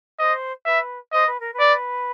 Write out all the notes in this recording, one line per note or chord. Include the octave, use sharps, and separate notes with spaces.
C5 D#5
B4 E5
C5 D#5
B4
A#4
B4
D5